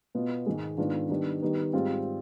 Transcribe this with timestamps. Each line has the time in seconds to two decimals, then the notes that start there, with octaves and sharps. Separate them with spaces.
0.15 B2 B3 F4
0.46 G#2 D#3 G#3
0.78 G#2 D#3 B3 D4 F4
1.09 D#3 G3 B3 D4
1.42 D#3 G3 B3 D#4
1.73 G#2 G3 C4 F4